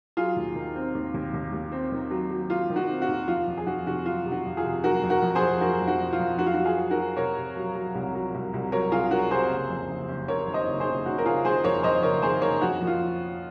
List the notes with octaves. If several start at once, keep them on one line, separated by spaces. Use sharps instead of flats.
F#3 F4 G#4
D#2
D#3
C4
D#2
D#2
D#2
D#2
C4
D#3
F#3
F#3
F#3 F4
D#3
F#4
C4
F#4
D#2
F2 F4
F2
G#4
F2 F#4
C3 F#4
F#3 F4
C3
F#4
F2
F4 G#4
C3
F#3 F#4 A#4
F2
F#4 A#4
F2
G#4 C5
F2
F#3 F#4 A#4
F2
F#4
F2
F4
F2
F#3 F#4
F4
F#3 F#4
F4 G#4
F#3
F#4 A#4
F#3
C3 A#4 C#5
C3
F#3
F#3
C2
F#3
C2
C2
F#3 A#4 C#5
C2 F4 G#4
F#3 F#4 A#4
C3 G#4 C5
F#1
F2
F#1
F#1
F#1 A#4 C#5
D#3
C5 D#5
F#1
G#4 C5
F#1
D#3 F#4
A#4
F#1 F4 G#4
D#3 G#4 C5
F2 A#4 C#5
F2 C5 D#5
F#1 A#4 C#5
D#3 G#4 C5
F#1 A#4 C#5
F2 F#4
F3
F4